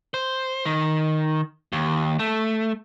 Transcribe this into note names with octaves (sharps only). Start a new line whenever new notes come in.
C5
D#3
D#2
A3